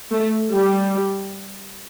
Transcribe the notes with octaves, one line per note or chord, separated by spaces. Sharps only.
A3
G3